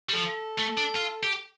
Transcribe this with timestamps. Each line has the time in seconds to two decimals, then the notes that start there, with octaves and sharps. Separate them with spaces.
0.09 G3
0.13 F3 A4
0.58 A3
0.77 D4
0.96 F4
1.23 G4